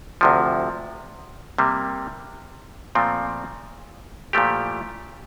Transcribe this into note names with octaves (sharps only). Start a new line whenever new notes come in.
D2 C3 F3
C3 G3 A#3
A#2 F3 A3 C4
A#2 F3 A3 E4 G4